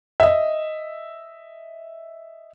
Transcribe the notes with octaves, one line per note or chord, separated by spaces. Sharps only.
D#5 E5